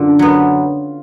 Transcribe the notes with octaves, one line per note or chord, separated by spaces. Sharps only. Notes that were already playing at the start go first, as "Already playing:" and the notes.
Already playing: F#2 D3 F4
F#3 B3